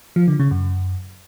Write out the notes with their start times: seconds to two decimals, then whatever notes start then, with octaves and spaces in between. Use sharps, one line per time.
0.16 F3
0.28 D3
0.40 C#3
0.51 F#2